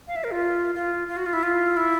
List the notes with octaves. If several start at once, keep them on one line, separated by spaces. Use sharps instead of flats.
F5
E5
A#4
F4
F4
F4
F#4
F4
E4
F4
E4